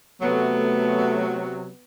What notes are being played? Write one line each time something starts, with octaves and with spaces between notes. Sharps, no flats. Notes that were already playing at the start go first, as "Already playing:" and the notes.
C3 F#3 A3 B3